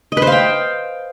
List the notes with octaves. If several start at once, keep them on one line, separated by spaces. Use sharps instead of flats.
D#5
B4
C5
F5
G5